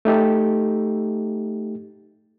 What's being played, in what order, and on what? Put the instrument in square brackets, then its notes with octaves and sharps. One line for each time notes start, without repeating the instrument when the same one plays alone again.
[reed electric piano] A3 D#4 G4 A4